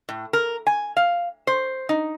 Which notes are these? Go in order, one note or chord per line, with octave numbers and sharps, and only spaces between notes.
A2
A#4
G#5
F5
C5
D#4